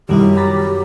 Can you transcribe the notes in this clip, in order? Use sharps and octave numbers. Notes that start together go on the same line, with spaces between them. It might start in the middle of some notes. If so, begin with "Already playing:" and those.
F#2 B2 D#3 G3 E4 G4
A#5 B5 A6